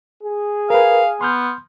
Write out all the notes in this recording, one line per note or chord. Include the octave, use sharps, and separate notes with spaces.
G#4
A#4 B4 F5
B3 C6 F6 G6